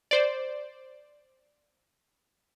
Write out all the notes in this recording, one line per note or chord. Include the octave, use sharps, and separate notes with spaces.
C5 D5